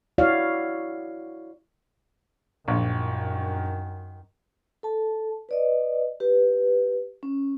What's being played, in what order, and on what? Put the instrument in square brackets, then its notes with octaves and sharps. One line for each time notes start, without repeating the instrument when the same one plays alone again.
[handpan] E4 F#4 C#5 D5 F5
[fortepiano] A#1 [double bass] F#2 D#3
[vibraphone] A4 A5
B4 D5 D#5
G4 B4
C#4